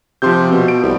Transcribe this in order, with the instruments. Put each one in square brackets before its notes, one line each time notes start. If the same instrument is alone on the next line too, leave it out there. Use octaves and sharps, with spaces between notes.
[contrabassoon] C3 [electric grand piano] F3 C6 G6
[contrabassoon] B2
[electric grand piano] D7
[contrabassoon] C2